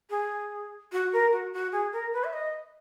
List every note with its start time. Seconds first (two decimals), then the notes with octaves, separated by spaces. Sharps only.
0.10 G#4
0.92 F#4
1.13 A#4
1.33 F#4
1.53 F#4
1.72 G#4
1.93 A#4
2.13 B4
2.24 E5
2.33 D#5